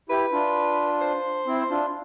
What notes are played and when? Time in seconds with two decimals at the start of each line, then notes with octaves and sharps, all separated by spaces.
0.09 E4 G4 B4
0.32 D4 F4
1.01 C5
1.47 C4 E4
1.70 D4 F4